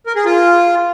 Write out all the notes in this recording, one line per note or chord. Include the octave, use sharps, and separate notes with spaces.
A#4
G#4
F4